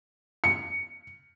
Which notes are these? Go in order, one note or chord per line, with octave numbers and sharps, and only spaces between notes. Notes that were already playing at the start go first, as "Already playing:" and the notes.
C#7